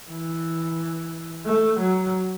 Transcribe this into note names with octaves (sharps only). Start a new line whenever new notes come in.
E3
A3
F#3